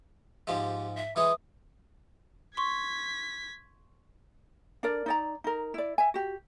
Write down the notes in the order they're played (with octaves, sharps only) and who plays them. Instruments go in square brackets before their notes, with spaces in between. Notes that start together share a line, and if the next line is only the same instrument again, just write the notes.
[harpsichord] G#2 F3 G#3 [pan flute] G4
[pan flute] E5
[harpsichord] E3 G#3 C#5 [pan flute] D#6
[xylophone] C6 C#6 [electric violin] G#6 B6
[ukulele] D4 A#4 D5
D#4 D5 A#5
D#4 A#4
E4 D5
E5 G#5
F#4 G4